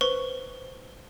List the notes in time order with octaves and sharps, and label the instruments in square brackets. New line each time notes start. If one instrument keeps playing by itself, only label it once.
[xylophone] B4 C5 C#6